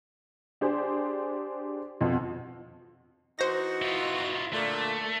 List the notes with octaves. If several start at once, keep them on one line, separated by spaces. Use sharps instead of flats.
D4 G4 G#4 C5
F2 B2 F3
E3 D#4 F#4 C5 A#6
E4 F4
A#2 D3 A3